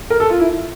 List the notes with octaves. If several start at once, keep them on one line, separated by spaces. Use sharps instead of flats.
A#4
A4
F4
E4